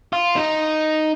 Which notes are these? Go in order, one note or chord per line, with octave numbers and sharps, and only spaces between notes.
F4
D#4